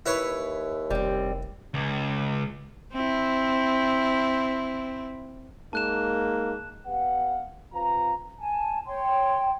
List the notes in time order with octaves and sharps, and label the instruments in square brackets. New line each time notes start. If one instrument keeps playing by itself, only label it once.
[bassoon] D#2 [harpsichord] E4 B4 C#5
[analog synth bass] F1 [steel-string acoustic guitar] G3 C4
[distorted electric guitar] C#2
[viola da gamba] C4 E4
[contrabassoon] G#2 [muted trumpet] A#3 [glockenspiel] A5 F#6 E7
[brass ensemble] B3 G4 B4 F5 F#5
C3 C4 F4 B4 F5 A#5
[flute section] G#5 A5
C#5 G5 C6